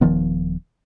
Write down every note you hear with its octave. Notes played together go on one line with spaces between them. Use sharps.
D#1 D#3 F3 B3